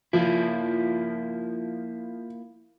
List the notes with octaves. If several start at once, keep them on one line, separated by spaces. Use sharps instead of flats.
F3 A#3 E4